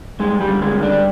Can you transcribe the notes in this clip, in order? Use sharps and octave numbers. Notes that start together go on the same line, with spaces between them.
G2 G#3
G3
D3
G#3
G2
D4